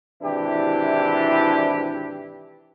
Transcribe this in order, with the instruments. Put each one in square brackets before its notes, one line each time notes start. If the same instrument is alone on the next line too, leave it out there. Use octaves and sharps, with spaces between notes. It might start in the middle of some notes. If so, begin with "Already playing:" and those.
[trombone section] G#1 C3 E3 D4 E4 G4